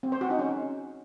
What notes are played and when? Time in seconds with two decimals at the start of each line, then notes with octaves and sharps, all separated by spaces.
0.03 C4
0.12 C5
0.21 F#4
0.30 D#4
0.39 C#4